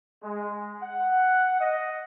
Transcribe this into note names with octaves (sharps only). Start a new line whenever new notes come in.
G#3
F#5
D#5